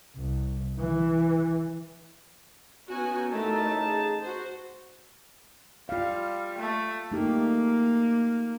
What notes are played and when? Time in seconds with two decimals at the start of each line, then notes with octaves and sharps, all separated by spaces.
0.16 C2
0.79 E3
2.89 B3 C#4 D#4 F#4 G#5
3.29 A1 A3 D#4 A#4 A5
3.82 G#4
4.21 F#4 C5
5.89 G3 F4 F5
6.58 A3
7.12 A3 A#3 D#4 G4